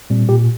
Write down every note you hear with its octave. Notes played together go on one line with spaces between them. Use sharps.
A#2 G3 C4
A#2 G4